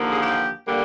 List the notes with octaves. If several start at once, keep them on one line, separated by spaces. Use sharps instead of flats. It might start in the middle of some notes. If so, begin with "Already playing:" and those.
Already playing: D#2 D3 F3 A#3
G#4
G4
D3 G3 A#3